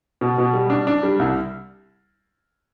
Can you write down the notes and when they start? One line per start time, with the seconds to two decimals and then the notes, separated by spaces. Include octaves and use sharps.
0.21 B2
0.38 B2
0.53 G3
0.70 D4
0.87 D4
1.03 G3
1.19 C2